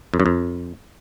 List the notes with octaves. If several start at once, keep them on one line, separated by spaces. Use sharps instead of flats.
F2
F#2
F2